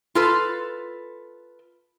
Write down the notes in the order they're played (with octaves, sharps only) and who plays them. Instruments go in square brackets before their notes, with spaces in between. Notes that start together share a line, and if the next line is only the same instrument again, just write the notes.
[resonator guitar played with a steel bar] F4 A4 B4